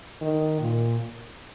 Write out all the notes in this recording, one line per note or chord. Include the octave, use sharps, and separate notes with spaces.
D#3
A#2